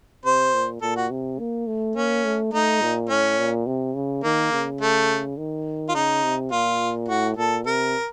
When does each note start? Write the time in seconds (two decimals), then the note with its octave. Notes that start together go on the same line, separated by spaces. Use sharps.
0.25 C3 C5
0.54 A#2
0.82 A#2 A4
0.97 F#4
1.10 C3
1.39 A#3
1.67 A3
1.96 A#3 C#4
2.25 A3
2.53 A3 D#4
2.82 A#2
3.09 A2 C#4
3.39 A#2
3.67 C3
3.95 C#3
4.24 D#3 A#3
4.53 C#3
4.81 A3
5.38 D#3
5.89 F4
5.95 C#3 D#4
6.24 C3
6.52 A#2 F4
7.08 A2 F#4
7.37 A#2 A4
7.66 C3 A#4